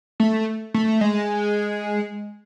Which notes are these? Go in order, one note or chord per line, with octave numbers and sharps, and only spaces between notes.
A3
A3
G#3